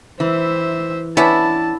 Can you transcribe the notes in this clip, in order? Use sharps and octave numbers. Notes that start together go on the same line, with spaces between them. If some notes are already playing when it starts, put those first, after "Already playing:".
E3 C5 E5
B3 C#4 D4 E4 A5